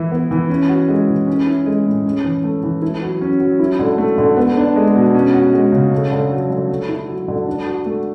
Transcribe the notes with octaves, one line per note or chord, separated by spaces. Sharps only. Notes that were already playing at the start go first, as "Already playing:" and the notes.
Already playing: E3 E4
B3
E3
C#4
F#4
G#3
E3
C#4
E4
G#3
A2
C#4
E3
A3
E3
E4
F#3
C#4
F#3
E4
D3
A3
D3
B3
D4
G#3
B2
C#4
F#4
G#3
C#3
A3
D3
F#3
D3
A3
E4
F#3
D3
D4
F#4
A3